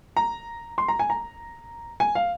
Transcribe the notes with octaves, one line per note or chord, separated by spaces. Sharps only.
A#5
C6
A#5
G#5
A#5
G#5
F5